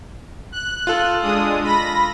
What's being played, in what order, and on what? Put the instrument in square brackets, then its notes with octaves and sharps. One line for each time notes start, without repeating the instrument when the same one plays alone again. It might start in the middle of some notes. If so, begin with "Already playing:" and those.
[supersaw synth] F#6
[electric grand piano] F4 A4
[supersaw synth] G#3 D4 D#6
B5 A#6